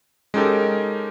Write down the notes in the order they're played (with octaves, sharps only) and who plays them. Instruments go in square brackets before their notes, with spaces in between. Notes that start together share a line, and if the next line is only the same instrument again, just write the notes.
[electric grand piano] G#3 C#4 D#4 G4 A4 A#4